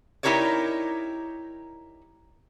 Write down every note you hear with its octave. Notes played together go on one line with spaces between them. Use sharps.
D#4 E4 G4 A#4 C#5 D5